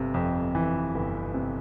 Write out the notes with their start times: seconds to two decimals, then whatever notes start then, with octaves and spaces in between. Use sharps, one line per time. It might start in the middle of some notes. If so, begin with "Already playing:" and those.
Already playing: G1 C3
0.14 F2
0.55 E3
0.95 G1
1.34 C3